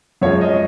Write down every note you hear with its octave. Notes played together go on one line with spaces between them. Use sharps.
F#2 F3 G#3 C#5
D#5